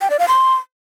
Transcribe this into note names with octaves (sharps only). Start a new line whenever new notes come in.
G5
D5
F5
C6